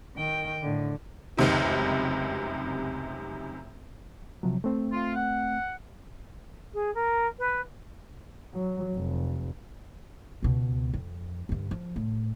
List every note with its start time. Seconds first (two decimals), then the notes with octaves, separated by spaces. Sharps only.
0.17 D#3 G5
0.63 A2 D3
1.37 F1 C#2 F#2 C3 D#3
4.43 C3 F3 F#3
4.64 A3 C4
4.92 F4
5.15 F#5
6.74 G#4
6.94 A#4
7.38 B4
8.54 F#3
8.95 F1
10.43 C#2 B2
10.94 F2
11.49 G2 D3
11.71 F3
11.96 A2